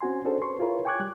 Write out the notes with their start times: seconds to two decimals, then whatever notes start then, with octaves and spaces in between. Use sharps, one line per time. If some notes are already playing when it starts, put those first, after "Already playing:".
0.01 C4 C#4 F#4 G#5 C6
0.25 C#4 D4 F#4 G#4 A4 C5
0.41 B4 C6 C#6
0.59 E4 F4 G#4 A#4 B4 C#5
0.85 G5 G#5 C#6 D6 F#6 G#6
1.00 G3 F#6